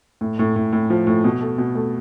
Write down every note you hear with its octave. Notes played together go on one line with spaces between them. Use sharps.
A2
A2
A2
A2
F3
A2
B2
A3
B2
A3